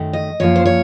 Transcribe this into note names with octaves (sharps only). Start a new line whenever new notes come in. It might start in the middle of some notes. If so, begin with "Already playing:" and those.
Already playing: F#2 D#3 A3
D#5
F#2 F3 A#3 C#5
C5
C#5